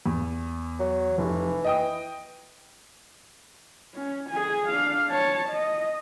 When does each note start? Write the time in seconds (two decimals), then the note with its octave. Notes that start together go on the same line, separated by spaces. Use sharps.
0.06 E2
0.80 F#3
1.18 F1 E3
1.64 D#5 G5 D#6
3.95 C#4
4.30 G#4 G#5
4.69 D4 F5
5.09 C#5 A5
5.49 D#5